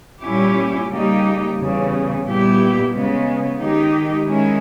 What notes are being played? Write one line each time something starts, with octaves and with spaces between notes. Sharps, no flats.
A#2 G3 C#4 E4 G4
C#3 G3 A#3 D#4 G4
E2 C#3 G3
A#2 G3 B3 E4 G4
C#3 G#3 B3
D#3 G#3 D#4 G4
D#3 G#3 C#4 E4